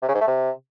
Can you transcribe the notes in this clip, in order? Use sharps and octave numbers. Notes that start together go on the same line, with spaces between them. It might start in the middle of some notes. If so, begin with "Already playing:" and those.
C3
C#3
G#2
A3
C3